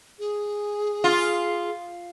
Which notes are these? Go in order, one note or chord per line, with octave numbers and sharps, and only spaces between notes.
G#4
F4